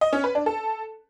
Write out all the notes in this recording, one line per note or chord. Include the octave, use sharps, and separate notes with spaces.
D#5
C#4
B4
D4
A4